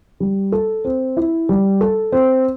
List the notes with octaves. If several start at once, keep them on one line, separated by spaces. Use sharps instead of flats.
G3
A4
C4
E4
G3
A4
C4